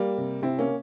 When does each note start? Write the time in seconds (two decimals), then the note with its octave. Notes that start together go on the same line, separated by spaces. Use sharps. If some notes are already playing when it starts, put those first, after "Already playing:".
Already playing: G3 A#3
0.18 C3
0.42 C3 C4 E4
0.59 A#3 C#4